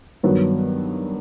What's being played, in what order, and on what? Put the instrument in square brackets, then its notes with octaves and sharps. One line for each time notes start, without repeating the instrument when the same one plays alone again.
[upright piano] G2 D#3 F#3 B3